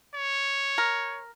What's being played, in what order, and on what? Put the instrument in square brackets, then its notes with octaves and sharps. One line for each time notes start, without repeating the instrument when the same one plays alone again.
[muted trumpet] C#5
[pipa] A#4